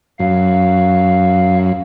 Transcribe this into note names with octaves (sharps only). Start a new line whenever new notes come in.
F#2 F5